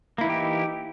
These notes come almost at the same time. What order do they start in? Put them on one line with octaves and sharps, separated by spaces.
A#3 E4 E3 D#4 G4